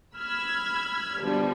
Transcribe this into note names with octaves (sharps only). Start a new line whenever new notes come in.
B5 E6 F6 G#6
B2 D3 F3 G3